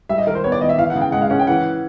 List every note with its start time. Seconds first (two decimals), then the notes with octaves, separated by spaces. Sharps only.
0.09 G3 E5
0.18 D#5
0.26 D#3 A#4
0.35 C5
0.44 B3 C#5
0.52 D5
0.61 D#3 D#5
0.69 E5
0.78 E3 F5
0.90 F#5
0.95 C#3
1.01 G5
1.12 G#3 F#5
1.21 F5
1.30 C#4 F#5
1.39 G5
1.47 E3 F#5